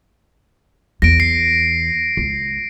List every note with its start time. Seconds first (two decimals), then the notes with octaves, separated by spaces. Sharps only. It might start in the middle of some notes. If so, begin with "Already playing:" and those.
1.02 E2 A#6 D7
1.20 C7
2.17 C#2